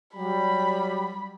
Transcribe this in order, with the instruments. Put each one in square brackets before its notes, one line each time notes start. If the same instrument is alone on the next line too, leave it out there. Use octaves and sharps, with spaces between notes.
[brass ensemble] F#3 G3 [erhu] B5